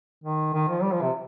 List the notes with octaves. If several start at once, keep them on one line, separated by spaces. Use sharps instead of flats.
D#3
D#3
F3
G3
F3
C3